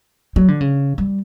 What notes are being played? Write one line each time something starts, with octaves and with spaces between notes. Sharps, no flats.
F#3
D3
C#3
G3